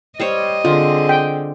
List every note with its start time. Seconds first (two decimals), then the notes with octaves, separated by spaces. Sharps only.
0.20 G3 C5 C#5 D#5
0.65 D3 C4 F4 G#4
1.09 G5